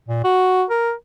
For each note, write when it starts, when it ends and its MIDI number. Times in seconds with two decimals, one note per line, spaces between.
0.09 0.21 46
0.24 0.64 66
0.70 0.92 70